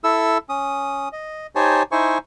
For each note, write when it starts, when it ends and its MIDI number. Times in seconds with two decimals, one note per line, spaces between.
0.04 0.38 64
0.04 0.38 69
0.04 0.38 88
0.49 1.09 61
0.49 1.09 87
1.12 1.47 75
1.55 1.83 63
1.55 1.83 67
1.55 1.83 72
1.55 1.83 73
1.55 1.83 80
1.55 1.83 81
1.92 2.18 63
1.92 2.18 64
1.92 2.18 72
1.92 2.18 80
1.92 2.18 85